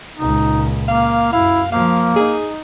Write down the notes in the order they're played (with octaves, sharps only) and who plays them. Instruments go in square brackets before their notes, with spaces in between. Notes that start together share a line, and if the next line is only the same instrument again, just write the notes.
[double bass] C#2 A#2 [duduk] D#4
[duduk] A#3 [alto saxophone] F5
[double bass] F#2 [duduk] E4 [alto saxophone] F5
[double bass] F3 [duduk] A#3 [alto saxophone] F5
[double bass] D#4 [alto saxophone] G#4